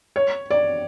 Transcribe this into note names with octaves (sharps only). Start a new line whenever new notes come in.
C#5
D5